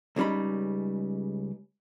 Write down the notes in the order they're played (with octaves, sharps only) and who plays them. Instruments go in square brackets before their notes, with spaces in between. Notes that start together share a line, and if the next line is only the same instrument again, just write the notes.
[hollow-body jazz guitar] C#2 C#3 G3 D#4 B5